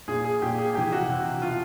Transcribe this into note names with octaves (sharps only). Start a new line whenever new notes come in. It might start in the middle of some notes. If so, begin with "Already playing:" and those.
A#2 G#4
G#4
A#2 G4
G#4
C3 E3 G4
F#4
C3 E3
B2 F4